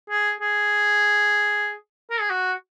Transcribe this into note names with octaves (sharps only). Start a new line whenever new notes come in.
G#4
G#4
A#4
G#4
F#4